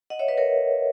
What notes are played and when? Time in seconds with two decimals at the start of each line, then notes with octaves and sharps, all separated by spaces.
0.10 D#5 F#5
0.19 C#5 E5
0.28 B4 D#5
0.37 A#4 C#5